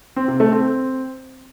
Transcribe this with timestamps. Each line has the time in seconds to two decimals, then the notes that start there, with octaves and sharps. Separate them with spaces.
0.16 C4
0.28 C3
0.40 A3
0.52 C4